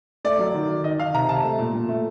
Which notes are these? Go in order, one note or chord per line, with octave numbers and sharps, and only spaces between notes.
A3 D5
F#3
D#3
D#3
D#3 D#5
D#3 F5
C3 A#5
C3 A5
A3
A#2
A#2
A3